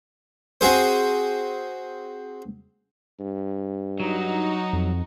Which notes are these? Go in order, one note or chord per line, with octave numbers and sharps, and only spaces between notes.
C4 F#4 G#4 C5
G2
F#3 D#4 F#4
F2